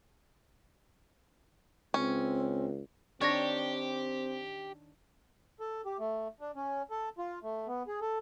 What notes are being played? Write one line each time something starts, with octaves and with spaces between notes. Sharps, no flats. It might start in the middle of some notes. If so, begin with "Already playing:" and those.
C#2 C4 C#4
D#3 C4 D4 G4 C#5 C#6 A#6
A4
G4
A3
D4
C#4
A4
F4
A3
B3
G#4
A4